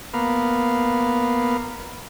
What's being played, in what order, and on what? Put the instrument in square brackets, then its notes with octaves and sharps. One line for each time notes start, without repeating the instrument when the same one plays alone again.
[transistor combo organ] A#3 B3 F5